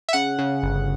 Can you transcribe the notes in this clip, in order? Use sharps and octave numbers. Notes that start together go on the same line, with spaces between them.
E5
C#3 F#5
C#3
G1